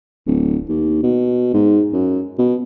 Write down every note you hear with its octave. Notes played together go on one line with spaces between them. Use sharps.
D1
D#2
B2
G#2
F#2
B2